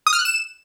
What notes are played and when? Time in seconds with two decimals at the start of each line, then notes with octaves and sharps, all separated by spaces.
0.07 D#6
0.13 F6
0.19 F#6
0.25 E7